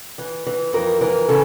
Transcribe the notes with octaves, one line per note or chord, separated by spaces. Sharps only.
E3
E3
F2 A#4
E3 A#4
C#3 A4